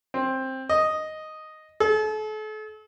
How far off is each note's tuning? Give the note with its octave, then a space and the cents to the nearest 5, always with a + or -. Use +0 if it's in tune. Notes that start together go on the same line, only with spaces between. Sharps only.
C4 +10
D#5 +0
A4 -40